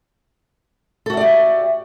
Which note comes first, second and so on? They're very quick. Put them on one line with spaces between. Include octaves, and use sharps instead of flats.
A4 F#4 E5 D5 G4